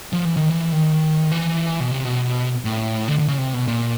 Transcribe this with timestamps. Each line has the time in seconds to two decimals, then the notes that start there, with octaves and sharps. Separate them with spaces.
0.13 F3
0.25 E3
0.37 D#3
0.49 E3
0.72 D#3
1.32 E3
1.80 B2
1.91 C3
2.05 B2
2.65 A2
3.08 D3
3.19 D3
3.28 C#3
3.38 C3
3.53 B2
3.67 A#2